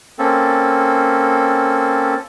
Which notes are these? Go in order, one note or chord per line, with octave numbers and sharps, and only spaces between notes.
A#3 C4 C#4 A4